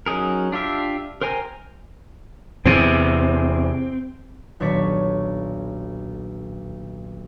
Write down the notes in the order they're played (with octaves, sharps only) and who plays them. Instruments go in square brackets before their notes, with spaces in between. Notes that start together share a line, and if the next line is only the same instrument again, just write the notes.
[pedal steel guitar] F#3 C#4 D#4 G#4 A#4
D4 F4 G4 E5
A#4 C5 G5 G#5 A#5
[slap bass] E2 C3 [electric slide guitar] C4
[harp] D#1 B1 D4 C#5 C#6 B6